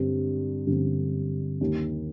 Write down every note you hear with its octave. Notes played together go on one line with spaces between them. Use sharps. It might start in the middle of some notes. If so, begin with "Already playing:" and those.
Already playing: G2 D3 G3 C4
G2 D3 G3 C4
D#2 D#3 A#3